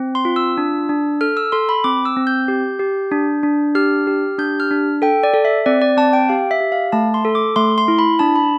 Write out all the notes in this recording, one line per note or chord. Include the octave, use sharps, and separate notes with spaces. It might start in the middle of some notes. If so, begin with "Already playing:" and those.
Already playing: C4
C6
F4
E6
D4
D4
A4 F6
E6
A4 C6
B5
C4 D6
E6
C4
G6
G4
G4
D4
D4
G4 F6
G4
D4 G6
F6
D4
A4 G5
D5
A4
E5
C4 D5
D5
C4 A5
G5
G4 F5
E5
G4
F5
A3 A5
C6
A4
D6
A3 C6
C6
E4
B5
D4 A5
B5